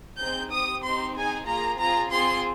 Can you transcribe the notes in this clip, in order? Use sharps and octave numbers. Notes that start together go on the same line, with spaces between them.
C4 D#4 G#4 G6
C4 G4 D#6
C4 D#4 G4 C6
C4 D#4 G#4 G#5
A#3 F4 G#4 A#5
C4 F4 G#4 A#5
C4 F4 G#4 C6